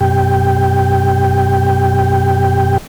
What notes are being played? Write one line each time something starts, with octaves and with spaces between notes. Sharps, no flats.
F#2 B2 G4 G5